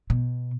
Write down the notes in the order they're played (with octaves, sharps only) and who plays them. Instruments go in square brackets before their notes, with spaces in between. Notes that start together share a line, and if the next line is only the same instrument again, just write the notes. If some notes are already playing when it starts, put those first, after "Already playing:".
[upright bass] B2